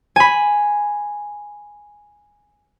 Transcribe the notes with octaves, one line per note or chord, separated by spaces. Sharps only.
G#5 B5